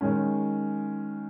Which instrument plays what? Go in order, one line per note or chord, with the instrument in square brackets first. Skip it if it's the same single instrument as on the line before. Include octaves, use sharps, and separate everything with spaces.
[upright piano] D#3 G#3 C#4